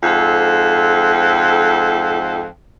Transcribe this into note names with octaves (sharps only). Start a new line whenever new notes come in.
F2 G#2 A4